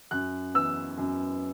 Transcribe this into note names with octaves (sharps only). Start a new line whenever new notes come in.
F#2 F#6
E3 B3 E6
F#2